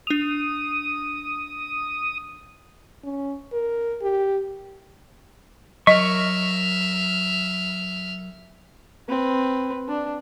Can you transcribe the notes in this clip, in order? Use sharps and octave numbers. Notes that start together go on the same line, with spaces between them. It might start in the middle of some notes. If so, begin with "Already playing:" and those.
D4 D#6 F7
C#4
A#4
G4
F#3 A#4 D#5 E5 C#6 F6
C4 B4
D4